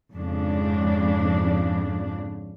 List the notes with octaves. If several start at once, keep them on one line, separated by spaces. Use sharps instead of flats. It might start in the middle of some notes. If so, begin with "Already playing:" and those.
F2 G#2 C#3 D4